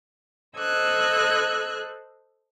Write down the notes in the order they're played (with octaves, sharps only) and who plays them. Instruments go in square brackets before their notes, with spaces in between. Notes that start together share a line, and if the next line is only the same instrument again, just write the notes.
[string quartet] A4 C5 D#5 E6 F#6 G#6